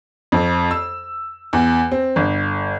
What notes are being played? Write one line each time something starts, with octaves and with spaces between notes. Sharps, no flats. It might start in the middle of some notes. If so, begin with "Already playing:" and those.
F2
E6
E2
C4
G1